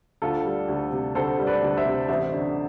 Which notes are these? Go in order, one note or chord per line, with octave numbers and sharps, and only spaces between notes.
D2 F4 A4
G3
D2
C3
D2 A4 C5
G3
B4 D5
D2
C5 E5
C3
A1 C5 E5
D3